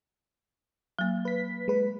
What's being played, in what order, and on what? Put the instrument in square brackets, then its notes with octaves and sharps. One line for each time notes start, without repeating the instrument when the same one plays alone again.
[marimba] F#3 A#3
[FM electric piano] B4 B6
G#3 B4